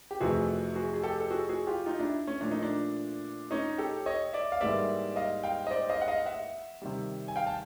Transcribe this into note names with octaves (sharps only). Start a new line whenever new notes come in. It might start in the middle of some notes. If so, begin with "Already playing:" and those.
G4
F2 C3 E3 A3 F#4 G#4
F#4 G#4
G#4
G4 A4
A4
F#4 G#4
F#4 G#4
F4 G4
D#4 F4
D4 E4
C#4
A#2 F3 A3 D4
D#4
D4
C#4 D#4
G4 A4
C#5 D#5
D5 E5
F5
G#2 E3 G3 A#3 D5 E5
D#5 F5
F5 G5
D#5
C5 D5
D#5 F5
F#5
D#5 F5
E5 F#5
C3 D#3 G3
G#5
F5 G5
A5